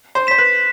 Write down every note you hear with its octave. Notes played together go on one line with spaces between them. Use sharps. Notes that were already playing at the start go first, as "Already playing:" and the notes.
C5
C5 B6 E7
B4